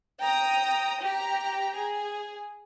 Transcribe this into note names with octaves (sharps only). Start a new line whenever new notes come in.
G5 A#5 D#6
G4 G5 A#5
G#4